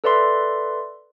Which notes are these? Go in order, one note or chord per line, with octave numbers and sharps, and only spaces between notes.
A4 B4 D5 E5 C6